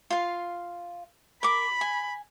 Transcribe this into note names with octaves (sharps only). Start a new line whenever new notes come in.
F4 F5
A#4 B5 D6
G#5